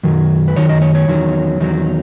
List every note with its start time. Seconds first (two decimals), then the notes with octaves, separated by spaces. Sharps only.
0.03 F#2 D#3 F#3
0.48 B4
0.56 F#2 D#3 F#3 C#5
0.69 D#5
0.82 C#5
0.95 C#5
1.08 E2 D#3 F#3
1.60 E2 D#3 F#3